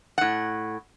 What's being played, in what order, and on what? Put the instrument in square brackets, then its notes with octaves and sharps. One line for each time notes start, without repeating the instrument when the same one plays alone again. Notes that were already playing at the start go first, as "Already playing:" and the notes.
[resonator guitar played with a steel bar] A2 F#5